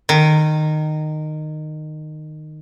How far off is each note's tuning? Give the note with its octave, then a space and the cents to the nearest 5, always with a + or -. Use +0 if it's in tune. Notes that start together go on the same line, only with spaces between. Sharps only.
D#3 -15